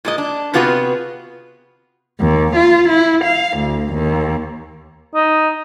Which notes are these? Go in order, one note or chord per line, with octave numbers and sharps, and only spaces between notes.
A#2 G#3 D#5
D4
C3 B3 F4 F#4 G#4 B4
D#2
F4
E4
F5
D2
D#2
D#4